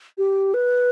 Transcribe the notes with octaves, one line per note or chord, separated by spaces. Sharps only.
G4
B4